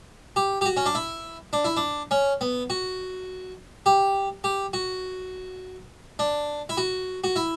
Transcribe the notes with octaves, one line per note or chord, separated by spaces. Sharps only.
G4
G4
F#4
C#4
D4
E4
D4
E4
D4
C#4
B3
F#4
G4
G4
F#4
D4
E4
F#4
F#4
E4